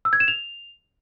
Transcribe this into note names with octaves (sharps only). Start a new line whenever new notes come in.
E6
G#6
E7
F7